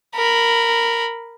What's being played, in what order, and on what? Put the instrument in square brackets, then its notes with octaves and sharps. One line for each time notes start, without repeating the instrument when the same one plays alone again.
[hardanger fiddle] A#4 B5